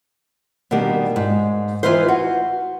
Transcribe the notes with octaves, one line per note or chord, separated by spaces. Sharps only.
B2 D#3 G3 A#3 D4
G#2
E3 B3 D#4 F4 B4 C5
F#4